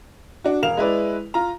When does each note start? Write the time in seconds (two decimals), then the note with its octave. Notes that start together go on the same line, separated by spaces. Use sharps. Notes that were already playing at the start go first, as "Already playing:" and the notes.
0.44 D4 F#4
0.62 E1 A#4 F5 F7
0.77 G#3 E4 B4 D5
1.34 F4 A#5